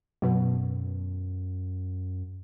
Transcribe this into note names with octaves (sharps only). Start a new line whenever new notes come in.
F#2 B2 F#3